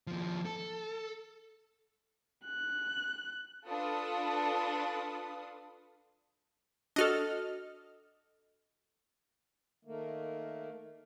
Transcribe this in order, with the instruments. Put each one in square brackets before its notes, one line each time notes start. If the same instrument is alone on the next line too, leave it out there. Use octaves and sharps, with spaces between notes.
[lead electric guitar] D#2 F3
A4
[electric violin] F#6
[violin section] D4 F4 A4 B4 D#6
[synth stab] D4 F#4 A4 [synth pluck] D#5 F6
[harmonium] D#3 A3 A#3